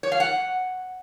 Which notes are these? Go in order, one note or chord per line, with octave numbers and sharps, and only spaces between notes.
C#5
F5
F#5